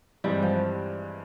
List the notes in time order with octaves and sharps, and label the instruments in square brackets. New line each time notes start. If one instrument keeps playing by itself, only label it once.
[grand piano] G2 E3 G#3 C4 [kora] G3
[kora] F3